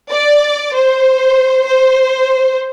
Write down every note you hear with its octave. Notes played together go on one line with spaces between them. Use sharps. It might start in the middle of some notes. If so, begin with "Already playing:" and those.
D5
C5
C5